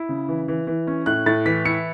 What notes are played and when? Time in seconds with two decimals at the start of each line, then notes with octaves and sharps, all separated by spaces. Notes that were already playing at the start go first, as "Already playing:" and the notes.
Already playing: E4
0.09 C#3
0.28 E3
0.48 E3
0.67 E3
0.87 C#4
1.06 A2 F#6
1.26 A2 A6
1.45 E3 B6
1.65 E4 C#7